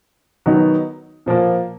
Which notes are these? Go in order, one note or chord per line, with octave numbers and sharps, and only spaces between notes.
D#3 F#3 B3 D#4
A#2 F3 A#3